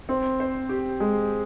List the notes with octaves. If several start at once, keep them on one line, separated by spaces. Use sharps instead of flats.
C4
C5
G4
G#3